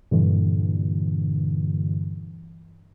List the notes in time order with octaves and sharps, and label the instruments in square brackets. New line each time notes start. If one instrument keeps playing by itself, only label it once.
[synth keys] G2 A#2 D3 E3